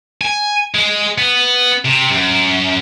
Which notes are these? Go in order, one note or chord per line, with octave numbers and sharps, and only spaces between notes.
G#5
G#3
B3
C3
F#2